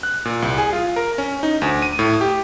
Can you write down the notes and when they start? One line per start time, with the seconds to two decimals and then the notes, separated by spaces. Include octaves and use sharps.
0.03 F#6
0.25 A#2
0.42 C2
0.58 G#4
0.73 F4
0.96 A#4
1.18 C#4
1.43 D#4
1.62 D2
1.82 D#7
1.99 A2
2.21 G4